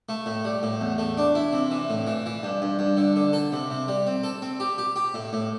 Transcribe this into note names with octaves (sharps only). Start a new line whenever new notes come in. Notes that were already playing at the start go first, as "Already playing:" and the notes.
A3
A2
G3
A2
E2
A3
D4
E4
C3
E3
A2
E3
E3
G2
G2
G2
D3
D3
A4
C3
C3
G3
C4
A4
C4
G4
G4
G4
A2
A2